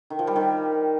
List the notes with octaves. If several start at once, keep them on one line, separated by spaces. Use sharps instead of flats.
D#3
F3
G3
D#3